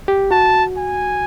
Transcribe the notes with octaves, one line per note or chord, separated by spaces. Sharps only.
G4
F#4 A5
G#5